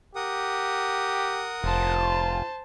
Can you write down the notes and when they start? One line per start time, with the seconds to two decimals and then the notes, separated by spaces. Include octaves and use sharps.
0.15 G4 A#4 F#5 D#6
1.64 F1 F4 C5 A5